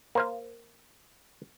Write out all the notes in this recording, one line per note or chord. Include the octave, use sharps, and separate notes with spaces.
A#3 C5 F5